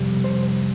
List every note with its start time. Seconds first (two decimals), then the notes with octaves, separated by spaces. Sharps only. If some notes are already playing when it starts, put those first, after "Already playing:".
Already playing: F2 C3 G3
0.24 C5